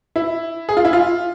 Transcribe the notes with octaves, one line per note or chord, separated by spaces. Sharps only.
E4
G#4
F4
E4
F4